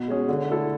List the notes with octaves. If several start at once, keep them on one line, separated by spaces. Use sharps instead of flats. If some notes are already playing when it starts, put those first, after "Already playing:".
Already playing: B2
G#3 C#4 G#4
D3
A3 E4 A4